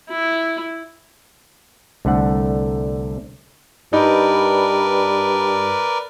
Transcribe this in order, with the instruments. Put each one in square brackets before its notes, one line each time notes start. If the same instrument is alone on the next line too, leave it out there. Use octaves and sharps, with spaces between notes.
[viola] E4
[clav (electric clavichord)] C2 D3 A3 F#5
[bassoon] G2 [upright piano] D#4 [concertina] A#4 B4 D5